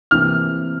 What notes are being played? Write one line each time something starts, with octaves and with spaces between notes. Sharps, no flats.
C3 E3 A#3 F6